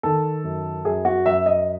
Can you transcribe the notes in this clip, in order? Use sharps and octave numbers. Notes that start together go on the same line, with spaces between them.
D#3 A4
F#2
F#2 G#4
F#4
F#2 E5
D#5